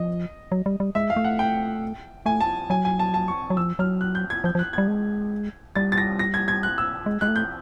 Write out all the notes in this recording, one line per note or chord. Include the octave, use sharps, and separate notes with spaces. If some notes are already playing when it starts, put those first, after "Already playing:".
Already playing: F3 D#5
F#3
G3
G3
G#3 E5
F5
A3
F#5
G5
A3 G#5
A5
F#3 G#5
G#5
A5
A5
C#6
F#3
F3 E6
F#3 F6
F#6
G6
G#6
F3 G6
F3
F#6
G3 G#6
G#3
G3 A6
A6
A#6
A#6
G#6
G#6
F#6
E6
G#3
G#3 F#6
A3
G6